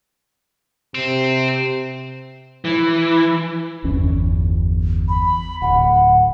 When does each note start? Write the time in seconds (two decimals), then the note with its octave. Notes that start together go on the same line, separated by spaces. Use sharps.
0.95 C3 C4
2.65 E3
3.84 G1 E2 C#4
5.09 B5
5.62 D1 F#5